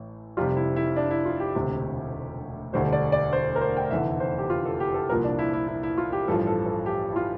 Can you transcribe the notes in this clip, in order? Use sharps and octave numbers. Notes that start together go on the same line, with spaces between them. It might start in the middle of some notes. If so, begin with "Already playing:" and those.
Already playing: A1 A2
F1 F2 C3 G3 F4
E4
E4
D4
E4
F4
G4
E1 D2 C3
E1 D2 D3 G3 C5
D5
D5
C5
A#4
C5
G5
F1 E2 D3 E5
C5
G4
F4
A4
G4
A4
C2 A#2 F3 A#4
D4
E4
E4
E4
E4
F4
G4
A1 G2 F3 A4
A4
A4
G4
E4
F4